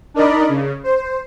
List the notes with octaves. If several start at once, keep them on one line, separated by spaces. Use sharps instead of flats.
D4 D#4 A#4 D5 D#5 B5
C#3
C5